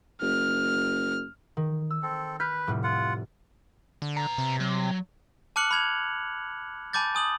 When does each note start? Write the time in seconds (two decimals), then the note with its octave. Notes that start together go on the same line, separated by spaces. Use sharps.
0.22 F#1 F6
1.57 D#3
1.91 E6
2.02 C4 A4
2.40 B4 F6 G6 B6
2.67 F1 A2 G3
2.83 F4 F#5
4.02 D3
4.17 B2 A#5
4.38 C3
4.60 F#3
5.56 A5 D6 F6 F#6 C#7 F#7
5.71 B5 F6 G#6 F7
6.93 G#5 A5 B5 D6 G6 A6
7.15 G#5 D#6 F#7